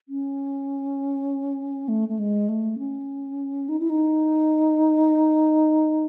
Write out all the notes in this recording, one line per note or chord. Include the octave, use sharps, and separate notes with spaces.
C#4
A3
A3
G#3
A3
C#4
D#4
E4
D#4